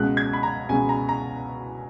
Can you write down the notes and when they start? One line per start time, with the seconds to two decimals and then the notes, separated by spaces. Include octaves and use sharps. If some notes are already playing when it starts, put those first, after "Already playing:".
Already playing: C#2 B2 G#3 F#6
0.17 G#6
0.33 B5
0.43 A#5
0.69 C#2 B2 G#3 G#5
0.89 A#5
1.09 A#5